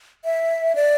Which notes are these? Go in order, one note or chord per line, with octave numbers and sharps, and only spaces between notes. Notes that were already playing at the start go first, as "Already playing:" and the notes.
E5
D5